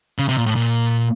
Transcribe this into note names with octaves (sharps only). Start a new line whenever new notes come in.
C#3
C3
A#2
A2
A#2